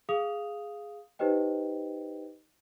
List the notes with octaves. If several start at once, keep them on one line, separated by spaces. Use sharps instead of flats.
G#4 F5 D#6 F7
D#4 G4 B4 C5 D#5 G5